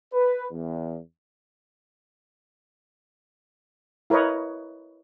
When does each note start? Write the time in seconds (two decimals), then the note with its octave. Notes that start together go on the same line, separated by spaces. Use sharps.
0.13 B4
0.51 E2
4.10 E4 A#4 B4 C#5 D#5